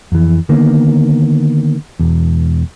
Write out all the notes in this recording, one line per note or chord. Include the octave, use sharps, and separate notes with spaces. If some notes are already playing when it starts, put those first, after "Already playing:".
F2 E3
D3 D#3 A#3 B3
E1 E2